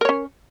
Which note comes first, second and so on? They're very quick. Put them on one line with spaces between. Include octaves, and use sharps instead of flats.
A#4 C#5 C#4